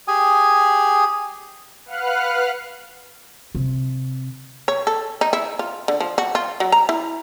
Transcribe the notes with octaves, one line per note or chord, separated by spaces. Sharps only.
G4 G#4 G#5
B4 F5 F#5 F6 F#6
C3
C#5
A4
D#4
E4
F4
D3
F3
F#4
F4
F#3
A#5
E4